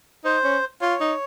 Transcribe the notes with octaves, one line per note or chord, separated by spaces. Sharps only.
D#4 C5
C#4
F4 C#5
D#4